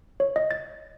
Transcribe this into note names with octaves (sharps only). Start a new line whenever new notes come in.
C#5
D#5
A6